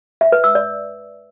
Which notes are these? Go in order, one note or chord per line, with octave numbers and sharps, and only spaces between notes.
E5
B4
E6
D5